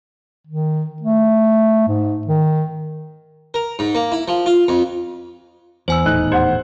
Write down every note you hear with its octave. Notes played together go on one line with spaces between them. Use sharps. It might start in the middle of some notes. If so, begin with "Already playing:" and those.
D#3
A3
G#2
D#3
A#4
G#2
A#3
E4
F3
F4
F2
E2 C5 G#5 E6
D#1 E2 A2 D#4 F#6
G4 C5 F#5